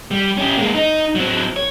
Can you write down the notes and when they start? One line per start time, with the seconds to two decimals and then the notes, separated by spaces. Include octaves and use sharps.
0.11 G3
0.37 C#4 G4
0.57 G#3 A#3
0.75 D#4
1.15 F#3 C4
1.56 C#5